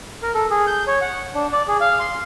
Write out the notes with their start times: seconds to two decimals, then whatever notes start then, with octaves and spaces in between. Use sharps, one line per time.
0.23 A#4
0.34 A4
0.50 G#4
0.67 G6
0.87 C#5
1.01 F#5
1.35 D4
1.52 D5
1.68 G#4
1.81 F5
1.99 C6